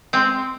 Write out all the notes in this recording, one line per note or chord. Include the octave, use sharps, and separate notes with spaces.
G#3 C4